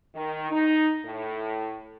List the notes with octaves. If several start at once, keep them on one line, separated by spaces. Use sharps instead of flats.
D#3
D#4
A2